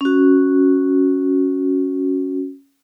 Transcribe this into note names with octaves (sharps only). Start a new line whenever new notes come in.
C#4 F#4